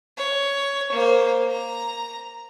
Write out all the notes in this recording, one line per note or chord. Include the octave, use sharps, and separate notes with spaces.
C#5
A#3 C5
A#5